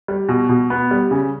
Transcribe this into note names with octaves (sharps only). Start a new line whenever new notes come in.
G3
B2
B2
B3
G3
C#3